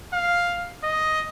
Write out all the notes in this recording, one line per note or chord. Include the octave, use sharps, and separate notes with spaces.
F5
D#5